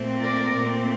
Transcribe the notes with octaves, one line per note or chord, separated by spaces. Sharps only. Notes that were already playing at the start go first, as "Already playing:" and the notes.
Already playing: A#2 A3 C4
A#4 D5
A#2 A3 C4